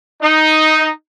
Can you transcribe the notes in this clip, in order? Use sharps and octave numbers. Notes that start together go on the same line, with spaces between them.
D#4